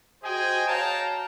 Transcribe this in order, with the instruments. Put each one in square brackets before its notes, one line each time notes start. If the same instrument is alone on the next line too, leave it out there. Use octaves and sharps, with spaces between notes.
[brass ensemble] F#4 G#4 C5 D#5 G5 G#5
C#5 F5 G5 A5 A#5